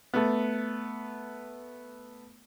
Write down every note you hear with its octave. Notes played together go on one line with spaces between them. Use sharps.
A3 B3